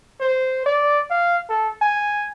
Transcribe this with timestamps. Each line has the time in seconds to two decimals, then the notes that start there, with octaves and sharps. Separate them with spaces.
0.20 C5
0.66 D5
1.10 F5
1.49 A4
1.81 G#5